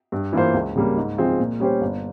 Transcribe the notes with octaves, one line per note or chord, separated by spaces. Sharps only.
G2
E3 A#3 F4 C5
C#2
C#3 G3 A#3
G#2
F3 C4 F4 G#4
A#2
G3 C#4 G4 C5
G1